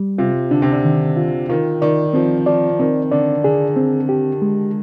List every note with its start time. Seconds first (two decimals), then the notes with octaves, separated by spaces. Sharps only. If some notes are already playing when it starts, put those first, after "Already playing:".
Already playing: G3
0.18 C3 F4
0.51 D3 D4
0.62 C3
0.72 D3
0.84 D#3
1.17 F4
1.49 D#3 F4
1.82 D#3 D5
2.14 F3 C4
2.46 F3 D5
2.79 D#3 C4
3.11 D3 D5
3.44 D3 G#4
3.76 C4
4.09 G4
4.42 G#3